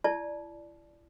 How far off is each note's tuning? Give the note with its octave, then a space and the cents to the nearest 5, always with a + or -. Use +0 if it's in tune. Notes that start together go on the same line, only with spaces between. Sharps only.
E4 +35 D5 +0 A5 -25